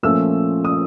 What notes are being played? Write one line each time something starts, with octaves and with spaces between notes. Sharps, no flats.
A#2 F3 A3 C#4 E6
D#6